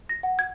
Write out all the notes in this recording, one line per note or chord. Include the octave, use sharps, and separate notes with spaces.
A#6
F#5
G#6